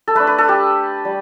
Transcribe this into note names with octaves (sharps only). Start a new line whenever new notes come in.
A4
A3 D4 B4
B4
A4
G4
G3